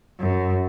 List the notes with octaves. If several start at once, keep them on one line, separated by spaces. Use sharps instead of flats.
F#2